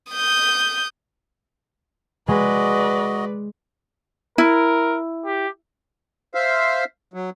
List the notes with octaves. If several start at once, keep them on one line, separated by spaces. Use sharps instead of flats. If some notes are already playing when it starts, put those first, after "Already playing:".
D#6 G6
G#3 F#4 B4 D5 D#5
E4 A#4
G4
C5 E5 F5
F#3